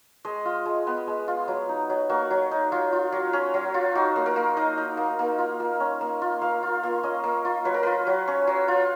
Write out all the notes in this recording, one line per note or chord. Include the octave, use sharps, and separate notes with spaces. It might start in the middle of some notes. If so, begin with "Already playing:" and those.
G#3 D#5
F4
G#3
B3 B4
G#3
F4
F#3
D#4
F#3
A#3 F#4
F#3
D#4
F#3 F4
F4
F#3
C#4
F#3
F4
D#4 F#4
A#3
A#4
A#3
D#4 D#5
D#4
A#3
A#3
F4
A#3
C#4
A#3
F4
A#3 F5
F4
A#3
C#4 D#5
A#3
F4
F#3 B4
A#4
F4 B4
F#3
C#4
F#3
F4